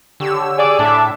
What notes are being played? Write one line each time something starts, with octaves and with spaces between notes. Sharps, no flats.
D3 G4 C#5 E6
G#4 D5
A2 D4 A4 E5